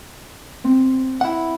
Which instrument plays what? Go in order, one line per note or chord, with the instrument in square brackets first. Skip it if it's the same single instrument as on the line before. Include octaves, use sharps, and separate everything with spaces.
[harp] C4
[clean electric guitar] E4 F#5